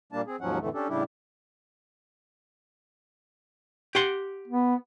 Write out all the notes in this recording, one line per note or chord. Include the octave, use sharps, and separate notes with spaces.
A#2 G3 A#3 D4 A5
C4 G#4
D#2 G#2 F3 F#3 C#4 F#5
F2 A2 D3 E3 A3
C#4 D4 G4 A4
A2 C#3 G3 D4 E4 G4
G4 F#5 C6
B3